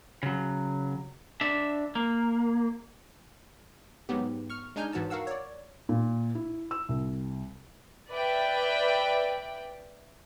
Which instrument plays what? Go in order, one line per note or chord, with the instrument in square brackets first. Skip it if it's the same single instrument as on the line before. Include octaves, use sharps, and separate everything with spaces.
[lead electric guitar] C#3 F#3
D4 E5
A#3
[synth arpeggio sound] G#2 F#3 B3 G4
C#6 F6
G#3 D4 D#4 G#5 F6 G6
G#2 E3 F#4 C#5 A5 E6
F#4 A#4 F5 F#5 E6
C#5 D5
[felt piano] A#2
E4
E6
C2
[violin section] B4 D5 E5 G5